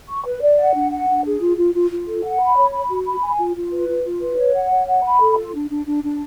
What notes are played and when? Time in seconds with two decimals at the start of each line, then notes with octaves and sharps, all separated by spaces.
0.08 C#6
0.25 B4
0.42 D5
0.58 F#5
0.75 D4
0.92 F#5
1.08 D4
1.25 G#4
1.41 F4
1.57 F4
1.73 F4
1.91 F4
2.07 A4
2.24 F#5
2.40 B5
2.56 C#5
2.72 B5
2.89 F#4
3.06 B5
3.22 G#5
3.39 F4
3.56 F4
3.72 B4
3.88 F4
4.04 F4
4.21 B4
4.38 C#5
4.55 F#5
4.71 C#5
4.87 F#5
5.04 B5
5.20 A4
5.37 F4
5.54 D4
5.70 D4
5.86 D4
6.04 D4